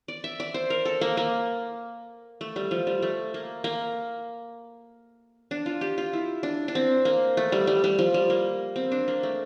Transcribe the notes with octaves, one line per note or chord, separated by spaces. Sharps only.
D5
E5
D5
C5
A#4
A4
A#3
A#3
A3
G3
F3
G3
A3
A#3
A#3
D4
F4
G4
F4
E4
D4
D4
C4
A#3
A3
G3
G3
G3
F3
G3
A#3
C4
D4
A#3
A3